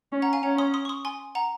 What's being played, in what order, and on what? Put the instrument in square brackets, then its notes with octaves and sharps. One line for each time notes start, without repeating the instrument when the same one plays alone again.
[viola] C#4
[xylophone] F#5 A#5
F5 G#5
[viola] C#4 [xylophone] F#5 A#5
[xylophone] C6 D#6
C6 D#6
C#6
C6 D#6
G#5 C6
F#5 A#5